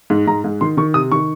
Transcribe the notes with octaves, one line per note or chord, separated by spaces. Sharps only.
G#2
G#2 A#5
G#2
D#3 C6
D#3 C#6
C3 D#6
D#3 C#6